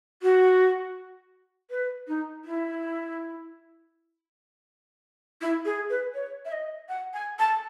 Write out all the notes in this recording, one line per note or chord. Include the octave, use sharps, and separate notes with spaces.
F#4
B4
D#4
E4
E4
G#4
B4
C#5
E5
D#5
F#5
G#5
A5